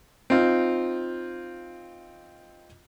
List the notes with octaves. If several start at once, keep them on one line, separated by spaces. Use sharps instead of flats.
C4 D#4 F4